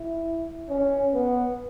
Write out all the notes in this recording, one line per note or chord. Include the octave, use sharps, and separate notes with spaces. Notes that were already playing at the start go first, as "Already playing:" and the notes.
Already playing: E4
C#4
B3